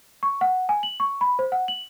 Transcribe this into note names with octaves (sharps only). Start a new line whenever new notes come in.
C#6
F#5
G#5
F#7
C#6
B5
C5
F#5
F#7